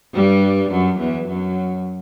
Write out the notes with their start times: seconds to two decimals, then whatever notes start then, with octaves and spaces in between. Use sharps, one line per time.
0.14 G2 G3
0.71 F#2 F#3
0.99 E2 E3
1.27 F#2 F#3